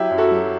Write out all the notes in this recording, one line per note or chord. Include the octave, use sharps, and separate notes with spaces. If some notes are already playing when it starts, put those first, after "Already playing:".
Already playing: F#3 E4 G4
F#2
F#4 A4
F#3